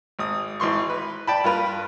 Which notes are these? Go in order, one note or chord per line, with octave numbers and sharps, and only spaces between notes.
G#1 D#6
G#1 E3 C6 C#6
B4
D5 G5 A5 B5
G2 F4 A#4 B4 B5